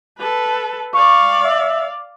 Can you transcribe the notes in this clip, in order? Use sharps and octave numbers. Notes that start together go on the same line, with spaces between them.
A4 B4
D5 F5 C#6
E5